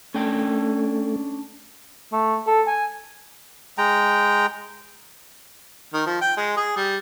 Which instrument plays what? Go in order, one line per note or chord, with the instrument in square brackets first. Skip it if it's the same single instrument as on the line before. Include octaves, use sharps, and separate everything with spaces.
[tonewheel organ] A3 [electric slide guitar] C#4 D4 G5
[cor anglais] A3
A4
G#5
[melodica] G#3 G5 A#5
[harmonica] D#3
F3
G5
G#3
G#4
G3